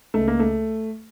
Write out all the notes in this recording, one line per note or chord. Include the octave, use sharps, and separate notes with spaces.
C#2 A3
A#3
A3